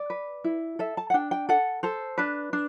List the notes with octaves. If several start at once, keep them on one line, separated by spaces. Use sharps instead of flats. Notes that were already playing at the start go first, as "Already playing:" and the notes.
Already playing: D5
B4
E4
A4 E5
A5
F#5
D4 G5
G5
A4 F#5
A4 C5
D4 B4
D4